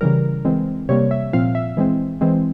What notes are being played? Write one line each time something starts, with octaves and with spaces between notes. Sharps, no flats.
C#3 E3 G3 A#4
E3 G#3 C4
C3 G3 A#3 C#5
E5
A#2 F3 C4 F5
E5
E3 G#3 C4
E3 G#3 C4